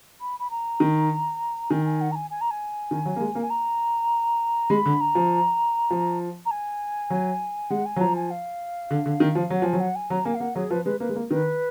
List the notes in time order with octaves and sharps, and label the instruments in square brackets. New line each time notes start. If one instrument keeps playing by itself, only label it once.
[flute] B5
B5
A#5
[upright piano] D#3
[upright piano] D#3 [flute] G#5
[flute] G#5
F#5
A#5
G#5
G#5
A#5
G#5
[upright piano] D#3
F#3
A#3
G#3
A#3
[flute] G#5
A#5
[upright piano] G#3 [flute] B5
[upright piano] D3
[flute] A#5
[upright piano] F3
F3
[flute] A#5
G#5
[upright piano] F#3
[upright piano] G#3 [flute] F#5
[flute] G#5
[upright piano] F#3
[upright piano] F3 [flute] A#5
[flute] G#5
F5
[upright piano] D3
D3
D#3
F3
[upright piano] F#3 [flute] F#5
[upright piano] F3 [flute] G#5
[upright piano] F#3
[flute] F#5
G#5
[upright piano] F#3 [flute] A#5
[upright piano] A#3 [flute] G#5
[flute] F5
[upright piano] A#3 [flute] F#5
[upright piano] F#3 [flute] G#4
[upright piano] F3 [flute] B4
[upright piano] G#3 [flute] B4
[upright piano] A#3 [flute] B4
[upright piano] G#3
A#3
[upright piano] D#3 [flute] B4